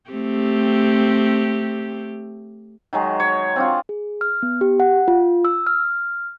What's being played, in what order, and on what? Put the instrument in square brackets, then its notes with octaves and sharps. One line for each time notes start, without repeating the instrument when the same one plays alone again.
[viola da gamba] A3 C4 G4
[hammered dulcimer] D#3 F#3 G#3
C#5
C4 D4 F4
[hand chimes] G#4
F6
B3
G4
F#5
F4
E6
F6